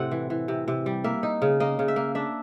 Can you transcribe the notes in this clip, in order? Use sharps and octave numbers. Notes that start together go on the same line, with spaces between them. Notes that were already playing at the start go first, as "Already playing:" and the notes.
Already playing: A2 C3 C4 F#5
E3
E3
C3
C3
G3
A#3 E5
D#4
C#3
A#3 D#5
C#3
E5
A#3
D4 E5